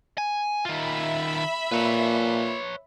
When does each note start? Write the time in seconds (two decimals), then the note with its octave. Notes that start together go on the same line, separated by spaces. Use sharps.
0.18 G#5
0.65 D#3 F4 E5 B5
1.72 A#2 B4 C#5